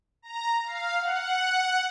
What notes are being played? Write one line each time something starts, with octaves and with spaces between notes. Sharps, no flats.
A#5
F5
F#5